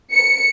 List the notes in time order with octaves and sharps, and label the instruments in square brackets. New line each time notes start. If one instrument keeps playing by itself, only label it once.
[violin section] C#7